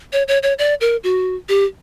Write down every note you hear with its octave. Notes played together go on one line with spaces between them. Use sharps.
C#5
C#5
C#5
D5
A#4
F#4
G4